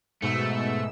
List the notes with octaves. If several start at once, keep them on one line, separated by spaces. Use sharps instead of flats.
G#2 B2 A3 E6